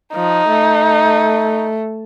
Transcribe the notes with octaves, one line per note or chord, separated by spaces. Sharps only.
F3 D#4
A3